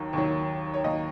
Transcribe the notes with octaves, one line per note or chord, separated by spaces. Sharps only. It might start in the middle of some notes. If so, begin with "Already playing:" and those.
Already playing: D#2 D#3 F#3
D#2 D#3 F#3
C#5
D#2 D#3 F#3 D#5